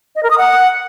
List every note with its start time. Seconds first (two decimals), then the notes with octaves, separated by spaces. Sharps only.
0.16 D#5
0.23 A#4
0.31 D#6
0.38 F#5